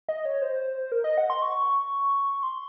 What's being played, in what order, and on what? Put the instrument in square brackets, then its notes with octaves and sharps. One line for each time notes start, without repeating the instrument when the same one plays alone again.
[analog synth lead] D#5
C#5
C5
A#4
D#5
F#5
C6
C#6
C6